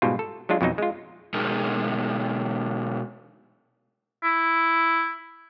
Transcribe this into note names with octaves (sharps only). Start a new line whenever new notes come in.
G#2 B2 G3 F4
A4
F#3 G#3 D4 F4
F2 B2 F#3 D#4
G#3 F4
B2 G#3 D#4 A4 A#4
E4